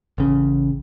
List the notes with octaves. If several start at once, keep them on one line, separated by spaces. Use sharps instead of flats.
A1 C#3